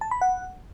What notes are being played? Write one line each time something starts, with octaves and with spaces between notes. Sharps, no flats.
A5
B5
F#5